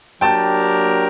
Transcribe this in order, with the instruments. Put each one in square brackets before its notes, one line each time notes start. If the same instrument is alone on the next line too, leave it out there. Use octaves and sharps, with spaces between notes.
[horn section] F#3 A#3 D4 G4 A#4 [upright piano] G5 A5